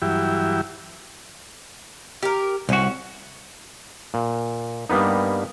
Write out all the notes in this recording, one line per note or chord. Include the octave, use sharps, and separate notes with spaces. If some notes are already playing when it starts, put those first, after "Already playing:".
G2 E3 F#3 E4 G4
G4 A#4
C2 C#4 F#4
A#2
G2 G3 A#3 B3 D#4